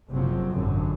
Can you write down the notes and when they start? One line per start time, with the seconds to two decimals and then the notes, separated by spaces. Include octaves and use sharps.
0.11 F#1 C3 F3 F#3 C4
0.50 G#1 F#2 D3